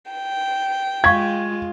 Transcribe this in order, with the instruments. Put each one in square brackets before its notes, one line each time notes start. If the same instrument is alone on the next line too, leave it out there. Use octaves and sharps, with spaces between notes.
[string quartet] G5
[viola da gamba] G#3 F4 [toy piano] F5 C#6 [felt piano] G#6